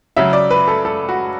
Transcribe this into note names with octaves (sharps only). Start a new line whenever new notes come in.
C#3 F#3 E5
D5
B4
A4
A4
F#4